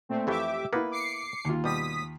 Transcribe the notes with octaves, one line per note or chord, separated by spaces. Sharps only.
A#2 A3 C4
F2 E3 A3 G4 E5 D6
A#3 B3 E4 B4
D6 C7 C#7
D#2 F4
B2 G3 D#6 B6